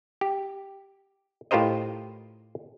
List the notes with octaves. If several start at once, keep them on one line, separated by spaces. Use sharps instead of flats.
G4
A2 F4 G4 A#4 C5 D#5